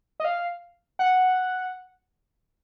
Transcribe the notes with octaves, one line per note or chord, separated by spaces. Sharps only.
D#5
F5
F#5